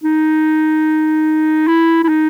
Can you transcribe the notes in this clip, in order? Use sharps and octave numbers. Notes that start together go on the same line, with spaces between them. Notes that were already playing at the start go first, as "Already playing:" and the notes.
D#4
E4
E4
D#4